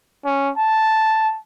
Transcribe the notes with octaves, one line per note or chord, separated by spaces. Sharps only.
C#4
A5